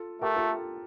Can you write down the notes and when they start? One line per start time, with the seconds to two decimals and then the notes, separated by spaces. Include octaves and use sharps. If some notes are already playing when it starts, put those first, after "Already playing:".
Already playing: F4 A4
0.21 A3 G4 A#4
0.36 F4 A4